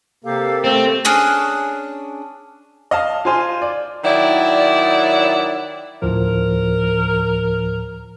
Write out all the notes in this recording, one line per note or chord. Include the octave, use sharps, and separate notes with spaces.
C3 A#3 G4 A4 F5
A3 C4
C#4 D4 G#4 F#6
D#5 F5 A5
F4 C5 G#5 C6
D5
D#3 F#3 E4 D5
D2 A2 F3 A#4